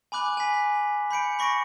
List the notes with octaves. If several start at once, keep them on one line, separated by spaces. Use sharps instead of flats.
G#5 B5 D6 F#6 F#7
G#5 B6
B5 G6 C#7 D7
B5 C#6 A#6 C#7 D7